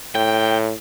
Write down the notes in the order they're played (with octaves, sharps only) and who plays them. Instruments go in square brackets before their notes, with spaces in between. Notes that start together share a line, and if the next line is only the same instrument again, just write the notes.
[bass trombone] A2 [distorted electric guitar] G5